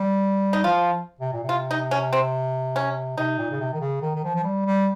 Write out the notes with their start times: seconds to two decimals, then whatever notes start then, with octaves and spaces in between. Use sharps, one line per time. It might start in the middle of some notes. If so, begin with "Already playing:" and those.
Already playing: G3
0.53 D#4
0.64 F3 F4
1.20 C3
1.33 A#2
1.43 C3
1.49 F4
1.71 D#4
1.91 C#4
2.13 C4
2.76 C#4
3.17 C3 D#4
3.38 A#2
3.51 C#3
3.60 C3
3.74 D#3
3.81 C#3
4.02 D#3
4.15 D#3
4.24 F3
4.36 F3
4.44 G3
4.66 G3